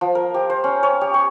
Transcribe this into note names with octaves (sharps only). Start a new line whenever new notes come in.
F3
A#4
G4
C5
C#4
C#5
G4
C#6